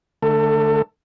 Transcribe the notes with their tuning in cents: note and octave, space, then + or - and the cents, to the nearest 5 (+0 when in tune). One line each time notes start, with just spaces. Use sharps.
D3 +0 A3 -15 A4 +30